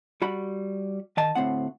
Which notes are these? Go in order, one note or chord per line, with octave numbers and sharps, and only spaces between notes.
G3 F#4 B5
D#3 D#5 A5
D2 A2 C4 F#5